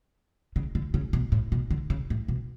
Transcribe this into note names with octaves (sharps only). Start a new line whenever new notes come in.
C#3
D3
C#3
B2
A2
B2
D3
C#3
A2
B2